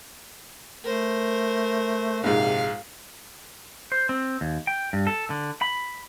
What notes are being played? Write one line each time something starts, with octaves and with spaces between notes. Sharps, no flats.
A3 A#4 C5
A#1 G#2 C3 F5
C5
C4
D#2
G5
G2
A4
D3
B5